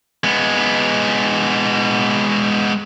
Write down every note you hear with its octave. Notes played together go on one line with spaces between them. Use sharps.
G#3 B3